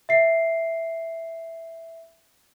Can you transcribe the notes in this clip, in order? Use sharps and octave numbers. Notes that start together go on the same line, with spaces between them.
E5 C7